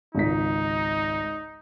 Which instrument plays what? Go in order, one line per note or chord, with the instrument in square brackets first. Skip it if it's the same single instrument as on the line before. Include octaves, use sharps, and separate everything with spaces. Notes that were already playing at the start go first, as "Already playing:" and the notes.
[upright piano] G#1 C#2 B6 [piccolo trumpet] D#4